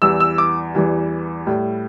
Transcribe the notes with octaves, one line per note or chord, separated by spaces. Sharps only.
E2 E3 G3 E6
E6
D6
E2 E3 G3
A2 G3